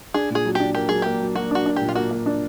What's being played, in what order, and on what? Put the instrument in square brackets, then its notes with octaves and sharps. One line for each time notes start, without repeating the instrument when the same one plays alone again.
[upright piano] D4 [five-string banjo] G#4
[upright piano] A#2 [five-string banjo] G#4
[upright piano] F#3
[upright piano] D4 [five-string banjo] G4
[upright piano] A#3 [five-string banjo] G4
[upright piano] F#3 [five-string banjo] G#4
[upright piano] A#3 [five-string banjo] G4
[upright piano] F#3
[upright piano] A#3 [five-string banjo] F#4
[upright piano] D4 [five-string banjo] F#4
[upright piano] D4
[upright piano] A#2 [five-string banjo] G4
[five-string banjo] F4
[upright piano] A#3 [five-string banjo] F#4
[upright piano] A#3
D4